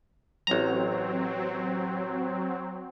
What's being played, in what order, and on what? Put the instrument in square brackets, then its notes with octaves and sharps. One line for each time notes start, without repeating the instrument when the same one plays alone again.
[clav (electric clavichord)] A1 A#5 [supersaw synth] F#3 C4